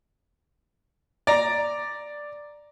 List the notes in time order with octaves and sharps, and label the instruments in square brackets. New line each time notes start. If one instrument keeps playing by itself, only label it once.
[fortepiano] D5 A#5